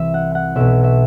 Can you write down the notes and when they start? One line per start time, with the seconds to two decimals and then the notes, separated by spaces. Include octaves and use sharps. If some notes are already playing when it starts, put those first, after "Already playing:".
Already playing: C2 C3 E3 E5
0.14 F#5
0.35 F#5
0.55 B1 B2 E5
0.84 E5